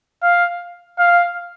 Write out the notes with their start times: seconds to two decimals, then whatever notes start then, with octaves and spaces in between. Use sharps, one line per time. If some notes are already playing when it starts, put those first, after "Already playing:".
0.23 F5
0.99 F5